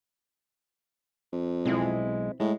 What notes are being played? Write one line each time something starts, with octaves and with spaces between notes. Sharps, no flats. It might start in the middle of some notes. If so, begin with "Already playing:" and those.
F2
B1 G#3 C4 E4
A2 G#3